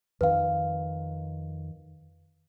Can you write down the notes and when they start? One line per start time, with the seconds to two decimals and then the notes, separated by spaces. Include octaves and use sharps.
0.21 F2 D#3 B4 F5